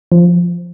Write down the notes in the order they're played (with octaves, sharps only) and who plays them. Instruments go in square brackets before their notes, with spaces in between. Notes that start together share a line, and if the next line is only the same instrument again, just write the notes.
[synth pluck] F3